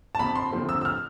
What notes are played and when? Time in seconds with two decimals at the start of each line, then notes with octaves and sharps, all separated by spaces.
0.15 A5
0.19 F2 B5
0.35 C6
0.51 D3 F3 A3 C4
0.69 E6
0.81 E6
0.85 F6